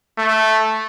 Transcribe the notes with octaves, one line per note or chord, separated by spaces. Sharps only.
A3